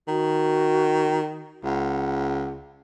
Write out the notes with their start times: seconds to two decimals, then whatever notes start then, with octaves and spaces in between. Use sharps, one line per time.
0.08 D#3 F#4
1.64 C#2 F#5